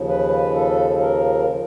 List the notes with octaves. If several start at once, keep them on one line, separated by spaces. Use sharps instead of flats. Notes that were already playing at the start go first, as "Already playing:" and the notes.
Already playing: D#2 C#3 F3
B4
A4
A#4